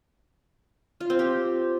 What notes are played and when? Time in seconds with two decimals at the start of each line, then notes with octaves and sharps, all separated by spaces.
1.01 F4
1.10 C4
1.19 G4